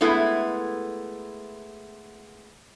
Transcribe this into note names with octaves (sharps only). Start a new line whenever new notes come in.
G#3 A3 B3 E4